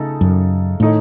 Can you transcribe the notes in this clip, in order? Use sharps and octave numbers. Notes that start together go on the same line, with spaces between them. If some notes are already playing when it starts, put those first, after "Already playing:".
Already playing: C#3 A3 D#4 A4
F#2
A2 D#3 A3 D#4